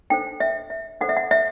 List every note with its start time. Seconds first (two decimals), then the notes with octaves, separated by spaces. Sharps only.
0.10 D4 A4 C5 G5
0.40 E5
0.70 E5
1.01 D4 A4 C5 F#5
1.09 E5
1.17 F#5
1.31 E5